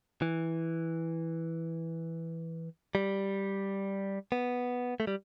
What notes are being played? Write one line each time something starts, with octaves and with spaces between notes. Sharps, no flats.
E3
G3
B3
A3
G3